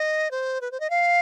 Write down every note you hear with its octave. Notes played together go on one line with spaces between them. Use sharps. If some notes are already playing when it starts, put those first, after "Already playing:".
Already playing: D#5
C5
B4
C5
D#5
F5